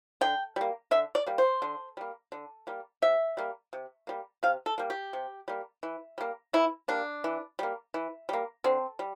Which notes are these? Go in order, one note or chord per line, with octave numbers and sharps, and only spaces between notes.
D3 G5
G3 A#3
D3 E5
D5
G3 A#3
C5
D3
G3 A#3
D3
G3 A#3
C3 E5
G3 A#3
C3
G3 A#3
C3 F5
A4
G3 A#3
G4
C3
G3 A#3
E3
G3 A#3
E3 E4
G3 A#3 D4
E3
G3 A#3
E3
G3 A#3
D3 C4
G3